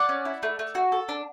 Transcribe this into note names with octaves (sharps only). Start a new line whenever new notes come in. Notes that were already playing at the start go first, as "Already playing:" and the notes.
Already playing: D5 F#5
C#4
E4
A3
A3
F#4
A4
D4